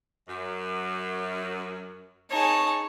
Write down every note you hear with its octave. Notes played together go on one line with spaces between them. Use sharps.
F#2
D#4 G#4 C#5 A5